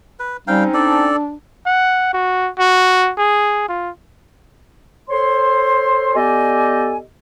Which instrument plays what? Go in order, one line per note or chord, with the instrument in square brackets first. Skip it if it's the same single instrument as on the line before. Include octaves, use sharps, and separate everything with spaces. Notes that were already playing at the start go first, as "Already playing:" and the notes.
[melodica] B4
[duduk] G3 [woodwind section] C4 C#4 D#4 [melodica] F5 G5
[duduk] D4 [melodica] A4 D5
[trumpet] F#5
F#4
F#4
G#4
F4
[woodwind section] A4 C5 C#5 C6
B3 G4 A4 D5 D#5 G#5